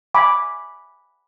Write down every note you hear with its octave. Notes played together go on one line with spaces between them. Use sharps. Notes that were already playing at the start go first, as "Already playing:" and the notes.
G#5 B5 D6